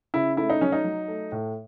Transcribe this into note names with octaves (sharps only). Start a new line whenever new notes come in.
C#3 E4
A3 E4
D#4
F#3 C#4
D#4
F#3
A3
A2